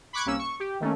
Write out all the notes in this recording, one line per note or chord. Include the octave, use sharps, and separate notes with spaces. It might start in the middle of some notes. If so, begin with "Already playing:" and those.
B5 C#6 D6 F#6 G#6
C2 A#3 C#4 E6
C#6
G4
D#3 A3 A#3 C#4